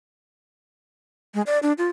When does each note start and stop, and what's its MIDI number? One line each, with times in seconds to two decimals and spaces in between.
1.34 1.42 56
1.47 1.59 74
1.63 1.73 62
1.78 1.89 65